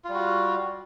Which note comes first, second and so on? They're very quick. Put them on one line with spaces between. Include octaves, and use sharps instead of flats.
F4 G3 F#4